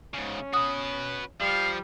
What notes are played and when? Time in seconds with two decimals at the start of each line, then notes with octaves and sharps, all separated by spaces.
0.14 G#2 C#3 C#4
0.54 F#4 B4 D#6
1.41 F3 G3 F5